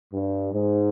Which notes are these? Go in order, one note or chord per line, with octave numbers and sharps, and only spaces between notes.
G2
G#2